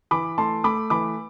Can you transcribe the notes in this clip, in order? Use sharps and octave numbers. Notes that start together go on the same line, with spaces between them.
E3 B5 D6
A3 A5 C6
A3 B5 D6
E3 B5 D6